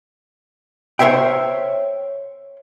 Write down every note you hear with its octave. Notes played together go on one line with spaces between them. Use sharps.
A#4 C5 C#5 E5 G5